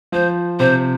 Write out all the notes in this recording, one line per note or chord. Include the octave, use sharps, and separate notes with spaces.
F3 C5
C3 C5